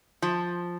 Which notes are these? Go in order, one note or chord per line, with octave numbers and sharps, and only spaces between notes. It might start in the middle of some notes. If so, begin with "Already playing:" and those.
F3